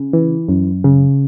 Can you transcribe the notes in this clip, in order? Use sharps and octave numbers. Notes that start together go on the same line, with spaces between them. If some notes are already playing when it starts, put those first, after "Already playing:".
Already playing: C#3
E3
F#2
C#3